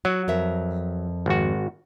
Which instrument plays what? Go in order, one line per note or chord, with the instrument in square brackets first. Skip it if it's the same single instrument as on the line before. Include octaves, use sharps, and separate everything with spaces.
[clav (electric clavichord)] F#3 [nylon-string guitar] F#4
[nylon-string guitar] F2 A#4 E5
[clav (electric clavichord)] G#1 F#4